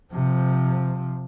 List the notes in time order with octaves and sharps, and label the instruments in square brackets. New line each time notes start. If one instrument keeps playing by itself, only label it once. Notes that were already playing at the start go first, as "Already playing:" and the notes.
[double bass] C3 F3